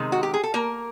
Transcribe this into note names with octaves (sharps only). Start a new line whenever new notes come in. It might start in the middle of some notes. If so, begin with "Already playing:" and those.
Already playing: C3 D#3 G#3
F#4
G4
G#4
A4
A#3 A#4